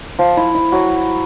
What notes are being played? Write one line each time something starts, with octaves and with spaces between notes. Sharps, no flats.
F3 F4
E4
E4
F#3 F#4